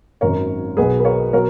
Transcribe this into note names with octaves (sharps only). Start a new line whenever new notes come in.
G#1 F#2 D#3 A#4 C#5
B1 B2 F#3 G#4 B4
B4
A#4 C#5
B2 F#3 A#4 C#5